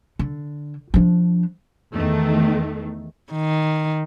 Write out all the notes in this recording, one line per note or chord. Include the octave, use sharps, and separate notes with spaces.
D3
F3 D4
E2 D#3 A3
D#3